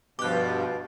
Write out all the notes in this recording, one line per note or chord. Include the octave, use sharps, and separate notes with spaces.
G2 B2 F3 G4 D6 F#6